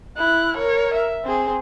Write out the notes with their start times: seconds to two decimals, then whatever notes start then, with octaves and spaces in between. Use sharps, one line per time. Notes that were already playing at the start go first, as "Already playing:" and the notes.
0.17 E4 F#6
0.57 A#4 C#5
0.94 E5
1.24 C4 G#4